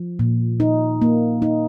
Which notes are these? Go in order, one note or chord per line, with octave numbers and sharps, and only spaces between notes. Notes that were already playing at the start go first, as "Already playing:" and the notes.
Already playing: F3
A#2
D#4
A#3
D#4